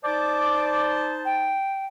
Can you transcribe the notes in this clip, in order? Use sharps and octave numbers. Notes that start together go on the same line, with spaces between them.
D#4 C5 D5 A5 D6
G5